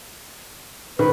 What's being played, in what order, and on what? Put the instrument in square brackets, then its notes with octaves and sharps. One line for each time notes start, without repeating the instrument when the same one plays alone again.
[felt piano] D#3 [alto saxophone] B4